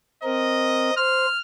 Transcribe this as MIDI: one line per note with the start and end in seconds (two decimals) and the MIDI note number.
0.23 0.90 60
0.23 0.90 70
0.23 0.94 75
0.97 1.26 72
0.97 1.40 89